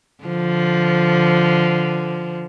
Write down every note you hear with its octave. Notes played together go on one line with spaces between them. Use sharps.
D3 F3